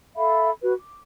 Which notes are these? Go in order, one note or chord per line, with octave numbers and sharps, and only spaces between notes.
A4 E5 F5 B5
F#4 B4
D6